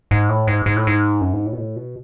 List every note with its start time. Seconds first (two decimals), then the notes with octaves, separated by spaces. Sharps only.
0.11 G#2
0.29 A2
0.47 G#2
0.66 G#2
0.77 A2
0.87 G#2
1.21 F#2
1.33 G#2
1.46 A2
1.53 B2
1.58 A2
1.76 B2